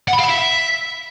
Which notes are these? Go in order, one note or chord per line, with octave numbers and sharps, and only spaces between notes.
F#5
B5
F5
B5
E5